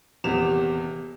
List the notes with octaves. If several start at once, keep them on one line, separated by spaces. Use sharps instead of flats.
D#1 E2 C3 E7 F7